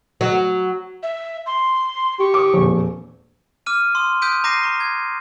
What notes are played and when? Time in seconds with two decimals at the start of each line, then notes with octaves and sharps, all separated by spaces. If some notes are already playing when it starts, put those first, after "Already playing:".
0.21 F#3
1.03 E5
1.46 C6
2.19 G4 C#6
2.34 D6 D#6
2.53 E1 F2 A#2
3.66 D6 F6 D#7
3.95 C6 D#6
4.22 D#6 F#6 G6 B6 D7 D#7
4.44 A#5 D6 G6 A#6 C7 D#7
4.63 A#5 C#6
4.80 G#6